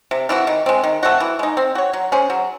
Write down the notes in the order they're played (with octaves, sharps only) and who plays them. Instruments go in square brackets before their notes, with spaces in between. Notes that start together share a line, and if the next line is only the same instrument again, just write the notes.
[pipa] C3
E3 C4 F#4
D#3
G#3 C4
D#3
A3 C4 F#4
E3
G#3 D#4
C4
F#4 C#5
F#3
C#4 G#4 C5
F#3